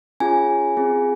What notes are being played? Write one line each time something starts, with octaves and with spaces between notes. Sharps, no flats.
C#4 F4 G#4 G#5
C4 F4 G#4